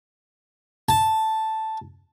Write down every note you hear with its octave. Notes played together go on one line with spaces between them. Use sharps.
A5